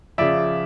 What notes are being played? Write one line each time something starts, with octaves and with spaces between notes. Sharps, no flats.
C#3 F3 D5 E5